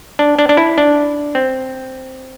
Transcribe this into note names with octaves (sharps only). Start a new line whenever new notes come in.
D4
D4
D4
E4
D4
C4